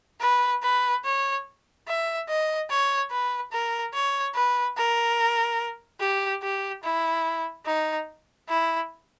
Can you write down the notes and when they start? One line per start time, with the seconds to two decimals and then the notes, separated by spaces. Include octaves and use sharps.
0.21 B4
0.62 B4
1.04 C#5
1.87 E5
2.28 D#5
2.70 C#5
3.11 B4
3.52 A#4
3.94 C#5
4.35 B4
4.77 A#4
6.00 G4
6.43 G4
6.83 E4
7.66 D#4
8.49 E4